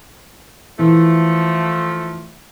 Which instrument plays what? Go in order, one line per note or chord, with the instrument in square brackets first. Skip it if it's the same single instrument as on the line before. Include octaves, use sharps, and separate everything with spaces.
[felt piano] E3 [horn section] F3 A3